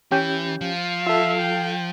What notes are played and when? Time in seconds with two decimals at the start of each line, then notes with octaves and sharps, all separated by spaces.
0.12 E3 C#4 G4 G6
0.61 F3 F5
1.07 F4 A4 E5
1.40 G5